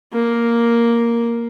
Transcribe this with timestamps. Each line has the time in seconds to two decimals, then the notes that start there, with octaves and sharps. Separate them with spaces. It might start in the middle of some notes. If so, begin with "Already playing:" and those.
0.13 A#3